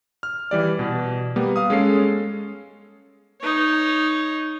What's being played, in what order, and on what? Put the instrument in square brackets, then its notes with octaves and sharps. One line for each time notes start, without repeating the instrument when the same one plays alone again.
[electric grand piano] F6
E3 G3 D5
B2
G3 A#3 B3
F5 D#6
G#3 C#4 A4 C7
[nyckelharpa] D#4 C#5